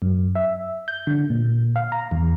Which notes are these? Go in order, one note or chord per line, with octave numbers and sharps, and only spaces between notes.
F#2
E5
G6
D3
A#2
F5
A#5
E2